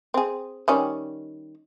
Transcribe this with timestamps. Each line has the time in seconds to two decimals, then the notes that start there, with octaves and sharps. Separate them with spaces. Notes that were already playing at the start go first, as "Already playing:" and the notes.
0.14 C4 G#4
0.68 D#3 G3 C#4